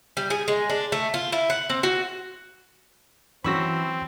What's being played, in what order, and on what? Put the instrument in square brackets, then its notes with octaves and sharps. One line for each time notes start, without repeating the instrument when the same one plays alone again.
[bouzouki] G3
G#4
G#3
D4
A3
F4
E4
F#5
C4
F#4
[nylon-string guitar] E3 [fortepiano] F#3 C#4 C#6 [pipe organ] C4 [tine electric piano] B5 E6 A#6